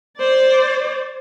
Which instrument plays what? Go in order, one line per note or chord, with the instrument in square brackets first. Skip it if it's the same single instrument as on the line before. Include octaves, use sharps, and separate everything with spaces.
[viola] C5 D5